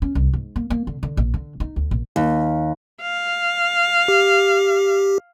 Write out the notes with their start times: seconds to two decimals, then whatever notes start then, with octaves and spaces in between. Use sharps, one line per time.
0.02 C#4
0.15 C2
0.34 G#2
0.56 A#3
0.70 A#3
0.87 D3
1.03 D3
1.17 A#1
1.34 D3
1.60 D#4
1.76 D2
1.91 A#1
2.16 D#2
3.02 F5
4.08 G4